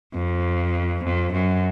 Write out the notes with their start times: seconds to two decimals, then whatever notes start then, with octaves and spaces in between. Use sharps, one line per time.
0.14 F2
1.03 F2
1.32 F#2